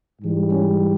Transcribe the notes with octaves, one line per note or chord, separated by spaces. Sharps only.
G#2 E3 G3
C#4